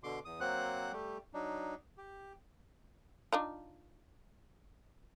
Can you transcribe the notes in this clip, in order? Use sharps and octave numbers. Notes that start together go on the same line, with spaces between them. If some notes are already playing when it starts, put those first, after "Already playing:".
B2 D3 C6 D6
E2 D#6
F#3 A#3 C4 C5 F#5 F#6
G3 A3 G4
F#3 D4 D#4
G4
D4 D#4 F4